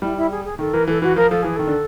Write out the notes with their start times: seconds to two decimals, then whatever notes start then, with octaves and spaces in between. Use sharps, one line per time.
0.02 G3 E4
0.16 E4
0.31 G#4
0.45 G#4
0.59 D#3 A4
0.73 E3 A#4
0.88 E3 A4
1.02 E3 F#4
1.16 F3 A#4
1.30 F3 A4
1.42 E3 G#4
1.56 D#3 A4
1.67 D3